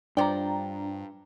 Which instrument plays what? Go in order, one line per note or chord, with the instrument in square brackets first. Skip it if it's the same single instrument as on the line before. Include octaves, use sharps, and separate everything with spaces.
[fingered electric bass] G2 [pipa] F3 D5 [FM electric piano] D4 [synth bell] G5 A#5